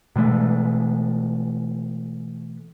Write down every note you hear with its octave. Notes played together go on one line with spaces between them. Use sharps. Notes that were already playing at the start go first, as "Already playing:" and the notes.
B2 E3 G#3 A3